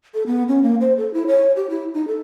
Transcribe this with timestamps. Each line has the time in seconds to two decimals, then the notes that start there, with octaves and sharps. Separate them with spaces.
0.14 A4
0.26 B3
0.48 C#4
0.63 A#3
0.81 C5
0.97 A4
1.14 E4
1.27 C#5
1.56 G4
1.70 E4
1.94 D#4
2.08 A4